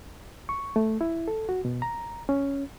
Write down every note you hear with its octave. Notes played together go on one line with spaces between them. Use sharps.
C#6
A3
E4
A4
F#4
B2
A#5
C#4